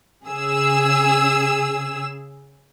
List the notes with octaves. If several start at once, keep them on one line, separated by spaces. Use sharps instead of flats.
C#3 G#4 E6